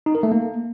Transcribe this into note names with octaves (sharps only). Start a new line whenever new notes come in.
D#4
A#4
A3
A#3